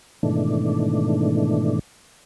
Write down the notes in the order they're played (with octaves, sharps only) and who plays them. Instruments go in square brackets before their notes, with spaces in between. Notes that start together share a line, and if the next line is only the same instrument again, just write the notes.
[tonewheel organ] G#2 B2 D#3 E3 A3 D4